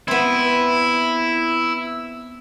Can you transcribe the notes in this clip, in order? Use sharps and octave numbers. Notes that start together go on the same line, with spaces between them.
B3 C4 E4